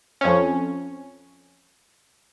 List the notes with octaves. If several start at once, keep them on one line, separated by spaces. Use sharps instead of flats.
F2 C#4